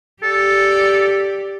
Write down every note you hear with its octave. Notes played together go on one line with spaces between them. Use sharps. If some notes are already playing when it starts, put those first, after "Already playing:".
G4 A4 D5